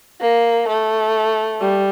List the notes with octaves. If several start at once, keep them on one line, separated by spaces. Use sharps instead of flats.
A#3
A3
G3